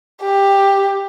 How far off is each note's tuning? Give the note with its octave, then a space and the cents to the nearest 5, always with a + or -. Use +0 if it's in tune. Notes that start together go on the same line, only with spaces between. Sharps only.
G4 +10